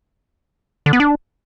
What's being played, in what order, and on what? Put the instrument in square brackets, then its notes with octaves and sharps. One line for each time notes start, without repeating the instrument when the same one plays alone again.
[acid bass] D3
B3
D4